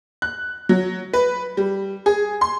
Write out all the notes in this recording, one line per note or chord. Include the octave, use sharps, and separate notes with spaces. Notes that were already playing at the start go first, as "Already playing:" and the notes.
F#6
F#3
B4
G3
G#4
C6